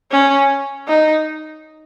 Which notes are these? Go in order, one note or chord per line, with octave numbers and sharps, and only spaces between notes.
C#4
D#4